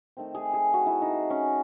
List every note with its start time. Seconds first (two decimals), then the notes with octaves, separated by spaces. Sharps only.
0.17 D#3 A3 C4
0.35 G#4
0.54 G#4
0.74 F#4
0.87 E4
1.02 D#4
1.30 C#4